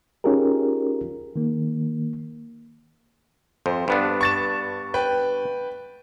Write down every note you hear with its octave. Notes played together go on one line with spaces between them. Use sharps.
C#4 D#4 F4 G4 G#4 A#4
D#3 A#3
F2 C5
G2 B3 D4
C#6 A6 E7
B4 G5